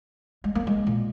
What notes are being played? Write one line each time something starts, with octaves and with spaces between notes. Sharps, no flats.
G#3
A#3
G#3
A#2